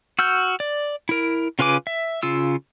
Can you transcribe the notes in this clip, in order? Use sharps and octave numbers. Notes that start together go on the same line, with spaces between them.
F#4 E6 F6 G6
D5
E4 A#4
C#3 F4 B4 G#5 D6
E5
C#3 F4 E6